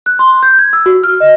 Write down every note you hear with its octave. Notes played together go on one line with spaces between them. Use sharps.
F#6
C6
G6
G#6
E6
F#4
F6
D#5